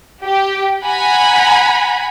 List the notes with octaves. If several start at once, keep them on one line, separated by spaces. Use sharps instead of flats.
G4
F#5 G#5 A#5 B5